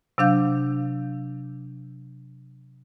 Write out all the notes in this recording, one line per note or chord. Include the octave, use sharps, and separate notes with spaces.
C3 F#3 D4 F5 G6